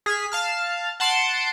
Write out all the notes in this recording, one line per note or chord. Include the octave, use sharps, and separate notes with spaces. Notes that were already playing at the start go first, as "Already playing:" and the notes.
G#4 F6 B6
F5 A5 F6
F#5 A5 C6 C7 D7